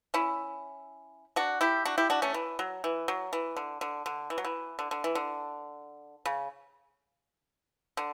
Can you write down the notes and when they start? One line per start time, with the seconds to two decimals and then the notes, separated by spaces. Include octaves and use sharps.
0.14 C#4 E4
1.36 D4 F#4
1.61 E4 G4
1.85 D4 F#4
1.98 E4 G4
2.10 D4 F#4
2.22 A3 C#4
2.34 E3
2.59 F#3
2.84 E3
3.08 F#3
3.33 E3
3.56 D3
3.81 D3
4.06 D3
4.30 E3
4.38 F#3
4.45 E3
4.79 D3
4.91 D3
5.04 E3
5.15 D3
6.26 C#3
7.97 D3